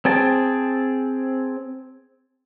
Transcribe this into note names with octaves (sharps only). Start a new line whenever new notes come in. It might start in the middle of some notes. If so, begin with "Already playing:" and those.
C4 G#4 G5 A5